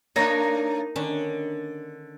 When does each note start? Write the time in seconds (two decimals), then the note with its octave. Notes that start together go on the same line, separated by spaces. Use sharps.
0.16 A3 A#3 D4 D#4 C#5
0.96 D3 D#3 C#4 D4